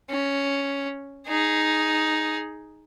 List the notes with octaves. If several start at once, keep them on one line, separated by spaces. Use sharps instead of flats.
C#4
D#4 G#4